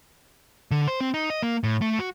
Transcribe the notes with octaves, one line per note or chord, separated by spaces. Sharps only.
D3
C5
C4
D#4
D#5
A#3
A2
A3
F#4